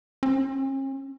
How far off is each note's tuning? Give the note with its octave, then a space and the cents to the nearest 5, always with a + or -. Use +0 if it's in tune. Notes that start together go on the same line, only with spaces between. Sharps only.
C#4 -45